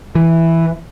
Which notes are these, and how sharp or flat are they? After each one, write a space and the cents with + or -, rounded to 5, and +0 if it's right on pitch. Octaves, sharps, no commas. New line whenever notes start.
E3 +0